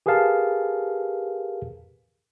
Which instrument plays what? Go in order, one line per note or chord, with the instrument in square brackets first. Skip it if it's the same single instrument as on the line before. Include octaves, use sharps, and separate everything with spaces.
[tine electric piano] G4 G#4 A#4 B4 F5 A5